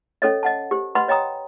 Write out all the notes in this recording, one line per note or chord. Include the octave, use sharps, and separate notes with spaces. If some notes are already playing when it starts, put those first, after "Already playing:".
C#4 A4 C#5 D#5
D#5 F#5 A5
G4 C5
B4 D#5 F#5 B5 C6
C#5 D#5 G5 A#5 D#6